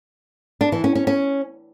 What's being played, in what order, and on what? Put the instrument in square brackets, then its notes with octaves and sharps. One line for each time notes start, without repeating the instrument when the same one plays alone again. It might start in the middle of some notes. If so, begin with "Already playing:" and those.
[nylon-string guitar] D4
E3
C#4
C#4
C#4